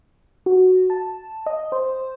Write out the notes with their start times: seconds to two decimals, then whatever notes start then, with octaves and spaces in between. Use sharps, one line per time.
0.46 F#4
0.90 A5
1.46 D#5
1.72 C5